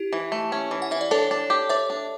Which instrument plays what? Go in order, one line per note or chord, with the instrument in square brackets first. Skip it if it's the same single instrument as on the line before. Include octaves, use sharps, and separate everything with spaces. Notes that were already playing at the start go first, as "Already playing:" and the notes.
Already playing: [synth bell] E4 G4
[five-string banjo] E3
A3
C#4
E3
[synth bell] F#5
[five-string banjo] E3 [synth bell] E5
[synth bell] D5
[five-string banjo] D4 [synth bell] A4 C#5
[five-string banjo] D4
G4
[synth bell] C#5 E5 [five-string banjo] D5
[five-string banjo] D4